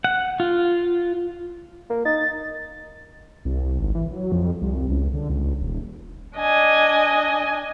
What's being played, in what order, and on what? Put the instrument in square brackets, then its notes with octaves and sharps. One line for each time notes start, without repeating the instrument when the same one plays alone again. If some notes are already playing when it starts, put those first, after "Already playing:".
[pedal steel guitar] F#5
F4
[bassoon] A#3
[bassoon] D#4 [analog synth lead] A6
[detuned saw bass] C2
G#1
E3
F#3
F2
C2
C#2
D3
C#2
D#1
[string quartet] D4 D#5 G#5